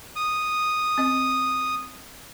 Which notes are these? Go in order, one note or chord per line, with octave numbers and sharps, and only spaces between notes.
D#6
C4 D#5